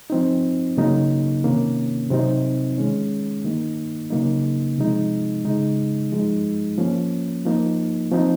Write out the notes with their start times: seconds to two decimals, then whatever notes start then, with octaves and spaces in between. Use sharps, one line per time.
0.10 F3 C4 D#4
0.77 C#3 F#3 A#3 D#4
1.44 C3 D#3 A#3 C#4
2.10 C3 F#3 C4 D#4
2.78 D#3 G#3 C#4
3.45 D#3 A#3 D#4
4.11 C#3 F#3 A#3 D#4
4.78 C3 F3 G#3 D#4
5.45 C#3 G#3 D#4
6.12 F3 G#3 D#4
6.78 F3 A#3 C#4
7.45 F3 A#3 D#4
8.12 F3 C4 D#4